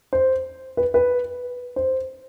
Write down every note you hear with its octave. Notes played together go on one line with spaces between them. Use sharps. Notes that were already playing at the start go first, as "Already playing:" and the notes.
C5
B4
B4
C5